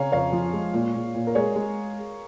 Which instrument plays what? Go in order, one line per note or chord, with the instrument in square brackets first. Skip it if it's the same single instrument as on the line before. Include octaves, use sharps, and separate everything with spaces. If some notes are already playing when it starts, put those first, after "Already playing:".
Already playing: [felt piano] C#3 [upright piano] C#5 F5 G#5 A#5
[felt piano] F2 [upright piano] C#5 F5
[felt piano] F3
G#3
A#2
A#2
A#2
[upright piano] A#4
[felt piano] G#3 [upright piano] G#4 C#5
[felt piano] G#3